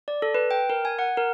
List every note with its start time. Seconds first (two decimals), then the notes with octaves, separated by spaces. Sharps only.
0.08 D5
0.22 A4
0.34 B4
0.51 G5
0.70 A#4
0.85 G#5
0.99 F#5
1.17 A#4